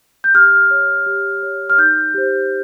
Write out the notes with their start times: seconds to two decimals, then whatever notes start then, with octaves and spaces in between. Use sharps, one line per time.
0.24 G6
0.34 G4 F6
0.71 C#5
1.06 G4
1.43 C#5
1.70 F6
1.78 D#4 G6
2.14 G4 C5